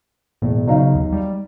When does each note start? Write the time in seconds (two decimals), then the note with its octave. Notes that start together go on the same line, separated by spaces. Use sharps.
0.42 E1 A2
0.67 C#3 F#3 D#4 F5
0.95 D#2
1.12 G3